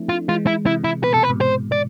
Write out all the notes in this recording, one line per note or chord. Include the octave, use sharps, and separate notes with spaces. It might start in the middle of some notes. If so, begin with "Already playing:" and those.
Already playing: F3 A3 C4 D4 E4
F4
E3 G#3 F4
E4
C3 E3 E4
E4
B2 B4
C3 A4
B4
G#2 B2
C5
D5